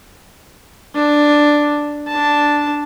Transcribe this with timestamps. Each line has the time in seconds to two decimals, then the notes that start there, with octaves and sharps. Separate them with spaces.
0.95 D4
2.08 D4 A5